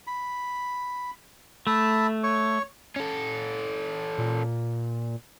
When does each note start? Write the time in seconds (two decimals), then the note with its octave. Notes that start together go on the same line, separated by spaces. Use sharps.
0.07 B5
1.67 A3 E5 A5 B5
2.24 C#5 C#6
2.96 C#4 A4
4.18 A#2